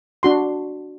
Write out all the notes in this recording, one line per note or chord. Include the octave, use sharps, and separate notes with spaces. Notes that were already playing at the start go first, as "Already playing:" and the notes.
D4 F#4 C6